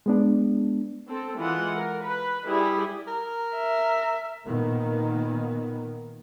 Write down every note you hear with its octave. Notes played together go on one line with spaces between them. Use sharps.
G#3 B3 D4
C4 A4
E3 G#3 F4 F#5
A#4
B4
G3 E4 G4 G#4
A#4
E5
A#2 D#3 A#3 B3